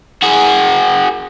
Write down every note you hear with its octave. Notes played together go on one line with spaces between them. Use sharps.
F#4 G#4